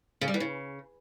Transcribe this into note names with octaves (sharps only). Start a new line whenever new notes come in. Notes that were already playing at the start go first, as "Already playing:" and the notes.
C#3
G3
E3
C#3